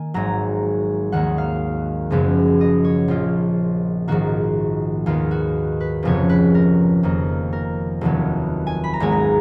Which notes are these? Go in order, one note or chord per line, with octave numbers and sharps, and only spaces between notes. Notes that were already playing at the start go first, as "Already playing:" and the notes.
Already playing: D#3 A#3 G#5
G#1 G#2 F#3 A#5
D#2 D#3 F#3 A#3 F#5
F5
F#1 F#2 C#3 F3 B3
D#5
C#5
A#1 A#2 F3 F4
A#1 G#2 D#3 A#3 F#4
D#2 D#3 G#3 B3 F4
F#4
B4
F1 F2 C#3 F3 B3 C#5
B4
A#4
F2 D#3 A#3
A#4
F1 D#2 D#3 F#3 B3
G#5
B5
A#5
G#1 G#2 D#3 G#3 B3 G#5
A#5